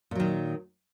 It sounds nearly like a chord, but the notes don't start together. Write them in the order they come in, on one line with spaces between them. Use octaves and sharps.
A#2 F#3 D#3